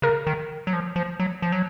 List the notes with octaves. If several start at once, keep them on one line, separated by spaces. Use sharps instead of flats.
C#3 A#4
D#3
F#3
F3
F3
F#3
F3
F#3